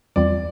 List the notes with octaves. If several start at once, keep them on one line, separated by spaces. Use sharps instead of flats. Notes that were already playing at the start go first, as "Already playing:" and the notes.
E2 E3 G3 C4 F4 D5